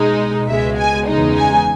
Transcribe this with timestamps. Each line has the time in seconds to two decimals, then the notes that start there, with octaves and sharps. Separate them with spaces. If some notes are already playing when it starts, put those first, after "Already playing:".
Already playing: B2 G#3 D#4
0.48 C#2 B2 G#3 E5
0.78 G#5
1.08 E2 C#3 G#3 D#4
1.37 G#5